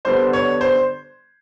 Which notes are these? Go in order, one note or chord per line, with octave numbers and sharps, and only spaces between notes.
D3 G3 B3 D4 C5
C#5
C5